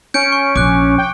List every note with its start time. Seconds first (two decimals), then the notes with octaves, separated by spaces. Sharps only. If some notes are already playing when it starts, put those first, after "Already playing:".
0.14 C#4 G6 C#7 D7
0.32 C#6
0.56 A#1 D6 F#6
0.98 G5